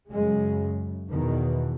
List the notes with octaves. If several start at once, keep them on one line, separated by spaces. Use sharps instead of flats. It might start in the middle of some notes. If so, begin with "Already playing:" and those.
F#2 C#3 G#3
E2 B2 D#3